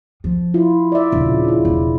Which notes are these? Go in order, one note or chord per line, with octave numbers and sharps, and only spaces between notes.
F3
E4 F4
D5 E5
D#1 C#3 F3 D4
E4 F4
E1